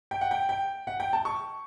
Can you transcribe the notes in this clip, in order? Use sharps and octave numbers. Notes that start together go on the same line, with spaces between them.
G5
F#5
G5
G5
F#5
G5
A5
C#6